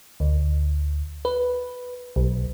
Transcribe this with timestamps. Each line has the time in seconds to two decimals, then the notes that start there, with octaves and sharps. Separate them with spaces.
0.20 D2
1.25 B4
2.16 B1